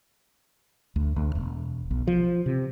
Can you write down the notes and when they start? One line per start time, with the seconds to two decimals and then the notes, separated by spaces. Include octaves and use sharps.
0.96 D2
1.16 D2
1.35 E1
1.91 B1
2.07 F3
2.46 C3